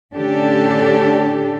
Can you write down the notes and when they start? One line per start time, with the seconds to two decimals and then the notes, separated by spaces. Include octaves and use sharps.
0.15 A2 D3 C#4 D4 G4 A4